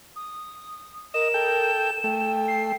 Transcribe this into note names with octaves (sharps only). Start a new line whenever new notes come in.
D#6
A#4 D#5 E7
A4 G5
A3 G5
C7